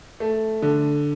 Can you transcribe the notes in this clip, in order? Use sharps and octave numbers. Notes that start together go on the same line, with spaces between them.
A3
D3